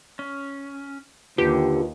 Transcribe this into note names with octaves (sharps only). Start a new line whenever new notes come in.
C#4
D#2 D3 F4 G4 B4